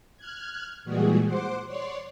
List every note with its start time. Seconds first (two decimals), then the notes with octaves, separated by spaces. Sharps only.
0.17 F6 F#6 G#6
0.85 A#2 E3 G3 G#3 F#4 G#4
1.25 C5 F#5 C6 D6
1.66 C#5 D5 C6